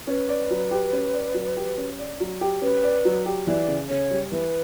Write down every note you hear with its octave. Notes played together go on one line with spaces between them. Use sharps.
C#4 B4
D5
F#3
G4
C#4
D5
F#3
G4
C#4
D5
F#3
G4
C#4 B4
D5
F#3
G4
E3 D5
C#3
C#3 C#5
G3
E3 B4